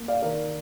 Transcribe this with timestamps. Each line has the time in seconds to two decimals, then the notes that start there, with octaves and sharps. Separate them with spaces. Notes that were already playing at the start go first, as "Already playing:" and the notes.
Already playing: A#3
0.08 D5 F5
0.22 D#3 A#4 D5